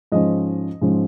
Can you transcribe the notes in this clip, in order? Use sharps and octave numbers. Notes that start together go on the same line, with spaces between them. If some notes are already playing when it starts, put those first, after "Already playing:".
G#2 F3 C#4 D#5
G#2 F3 C#4